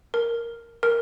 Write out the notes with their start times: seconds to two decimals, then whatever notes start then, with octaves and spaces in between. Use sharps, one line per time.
0.14 A#4
0.83 A#4